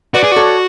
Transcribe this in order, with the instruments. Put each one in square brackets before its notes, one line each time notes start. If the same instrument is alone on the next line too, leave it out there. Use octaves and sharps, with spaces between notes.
[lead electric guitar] F#4 [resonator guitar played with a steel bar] B4 D5
[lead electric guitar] G#4
[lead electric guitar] F#4 [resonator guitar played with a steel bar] A4 C#5